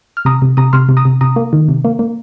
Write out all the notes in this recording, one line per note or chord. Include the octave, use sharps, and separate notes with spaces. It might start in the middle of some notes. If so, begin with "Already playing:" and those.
F6
C3 A#5 D#6
C3
C3 A#5 D#6
C3 C6 F6
C3
A#5 D#6
C3
C3 A#5 D#6
A#3
D#3
C3
A#3
A#3